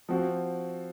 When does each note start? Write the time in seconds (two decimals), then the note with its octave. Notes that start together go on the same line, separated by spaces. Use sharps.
0.09 F3 C4 F#4